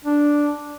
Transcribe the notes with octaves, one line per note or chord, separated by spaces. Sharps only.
D4